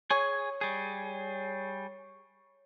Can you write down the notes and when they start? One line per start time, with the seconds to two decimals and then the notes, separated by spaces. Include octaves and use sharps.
0.10 G#4 C#5 G#5
0.61 G3 G#4